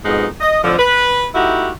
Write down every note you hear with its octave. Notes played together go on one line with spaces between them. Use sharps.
F2 G#2 B2 G#3 D#4
D#5
F2 A2 D3 F3
B4
A3 D#4 E4 F#4 G4